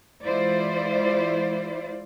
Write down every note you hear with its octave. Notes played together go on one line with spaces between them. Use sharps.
E3 G#3 E4 F4 C5 D5